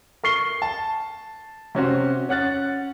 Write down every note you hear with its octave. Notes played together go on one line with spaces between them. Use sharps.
A#4 C#6 C7 G7
A5
C3 C#4 F#4 C5
C#4 F#5 F#6 A6